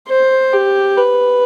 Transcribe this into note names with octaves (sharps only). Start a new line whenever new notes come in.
C5
G4
B4